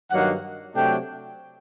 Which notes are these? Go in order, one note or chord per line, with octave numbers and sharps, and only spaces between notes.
G2 D#3 F#3 A#3 D#4 F#5
C3 F#3 A3 D4 G5